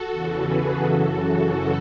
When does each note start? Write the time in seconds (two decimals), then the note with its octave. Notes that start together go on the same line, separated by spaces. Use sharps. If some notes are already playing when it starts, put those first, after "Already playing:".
Already playing: F#4 A4
0.10 E2 C#3 E3
0.44 G#4 B4
0.77 F#2 C#3 E3 F#4 A4